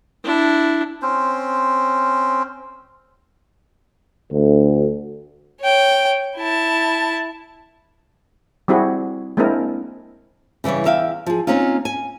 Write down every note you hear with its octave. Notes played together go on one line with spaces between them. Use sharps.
D4 E4
C4 C#4 C5
D2
C#5 G5
E4 A5
G3 C4 E4 F#4 G#4
G#3 A#3 C4 D4 E4 A#4
C#3 E3 G3 G4 C#5
E2 E5 F5 G5
F3 G#4
A#3 C4 C#4 D#4 F4
G#5